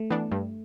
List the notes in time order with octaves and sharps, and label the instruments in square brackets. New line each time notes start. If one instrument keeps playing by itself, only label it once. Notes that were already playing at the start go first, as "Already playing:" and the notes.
Already playing: [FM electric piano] A3
[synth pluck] E3 B3 D4
G2